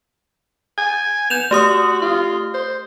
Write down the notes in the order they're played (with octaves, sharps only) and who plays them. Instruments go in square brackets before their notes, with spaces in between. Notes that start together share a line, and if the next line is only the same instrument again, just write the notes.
[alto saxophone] G#5
[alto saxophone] B3 [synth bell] G6 E7 F7
[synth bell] A3 G4 D#6 [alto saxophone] F#4
[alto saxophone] F4
C5